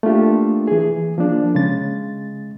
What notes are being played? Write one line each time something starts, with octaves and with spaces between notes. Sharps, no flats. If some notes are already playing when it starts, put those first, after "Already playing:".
A3 A#3 D4 F4 G4
E3 G#4
F3 A#3 D4
C#3 G#3 A6